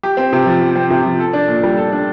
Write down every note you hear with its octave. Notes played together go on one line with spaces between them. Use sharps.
G4
C4
C3
F3
G4
C4
C3
F3
A4
D4
A#2
G3
A4
D4